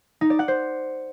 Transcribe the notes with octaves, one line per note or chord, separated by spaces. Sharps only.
D#4
D5
F#5
C5